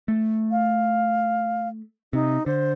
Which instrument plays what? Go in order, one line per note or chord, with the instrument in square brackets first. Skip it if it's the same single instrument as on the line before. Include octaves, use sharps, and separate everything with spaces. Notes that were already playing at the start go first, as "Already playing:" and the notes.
[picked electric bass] A3
[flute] F5
[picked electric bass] C3 [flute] D#4
[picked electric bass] D3 [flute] C5